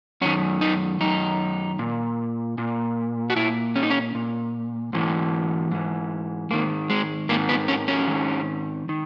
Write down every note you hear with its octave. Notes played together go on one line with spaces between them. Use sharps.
F#2 D#3 C#4
D#4
F#2 D#3 D#4
A#2
A#2
F#4
A#2 E4
C#4
D#4
C#4
A#2
G#2 E3
G#2 E3
G#2 D#3 A#3
G#3
G#2 D#3 A#3
B3
C#4
C#4
G#2 D#3
D#3